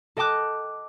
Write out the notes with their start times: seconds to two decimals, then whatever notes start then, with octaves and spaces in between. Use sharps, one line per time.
0.17 A4 D#5 G5 A5 D6 F#6